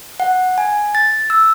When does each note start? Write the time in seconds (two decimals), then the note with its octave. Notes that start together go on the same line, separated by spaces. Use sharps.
0.20 F#5
0.58 G#5
0.95 A6
1.30 E6